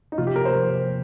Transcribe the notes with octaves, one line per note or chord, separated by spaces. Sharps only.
D#4
C3 F3 A#3 F4
G4
A#4
C5
C3 F3 A#3